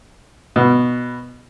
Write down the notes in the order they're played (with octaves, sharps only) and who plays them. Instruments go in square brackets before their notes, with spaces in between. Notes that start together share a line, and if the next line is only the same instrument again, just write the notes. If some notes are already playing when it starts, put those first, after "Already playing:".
[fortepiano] B2